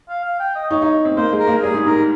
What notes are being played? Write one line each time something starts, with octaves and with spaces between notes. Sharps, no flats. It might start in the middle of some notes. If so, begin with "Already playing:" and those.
F5
F5
G5
D#5
D#4 C#5
D#4
C4
A#3 C5
G#3
A#4
A#3
G3 G#4
G#2
G#2 A#4